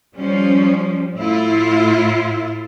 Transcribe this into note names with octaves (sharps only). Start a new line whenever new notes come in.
F3 G3 C#4
A2 E4 F4